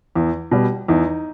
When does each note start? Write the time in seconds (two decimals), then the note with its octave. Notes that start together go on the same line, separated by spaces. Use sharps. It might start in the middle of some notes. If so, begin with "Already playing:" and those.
0.15 E2
0.51 B2 G3
0.88 E2 D#4